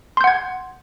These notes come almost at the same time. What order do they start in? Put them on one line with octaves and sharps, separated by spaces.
C6 G6 F#5 G#6